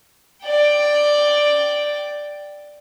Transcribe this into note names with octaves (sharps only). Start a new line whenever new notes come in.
D5 G5